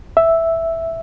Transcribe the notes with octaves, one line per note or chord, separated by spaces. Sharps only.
E5